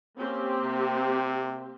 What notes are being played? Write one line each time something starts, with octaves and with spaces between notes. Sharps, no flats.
A#3 C4 C#4 G4
C3